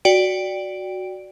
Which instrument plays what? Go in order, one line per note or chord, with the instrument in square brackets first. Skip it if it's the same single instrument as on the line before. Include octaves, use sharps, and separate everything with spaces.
[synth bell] F#4 D5 G5 D7